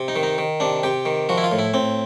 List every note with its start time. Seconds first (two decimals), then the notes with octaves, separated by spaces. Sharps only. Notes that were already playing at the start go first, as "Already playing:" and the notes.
Already playing: C3
0.08 D#4
0.16 D#3
0.23 D#4
0.38 D#3
0.60 C3 D4
0.83 C3 G4
1.06 D#3
1.29 F3 F#4
1.38 E4
1.43 F4
1.52 A2
1.59 E4
1.74 A2 C4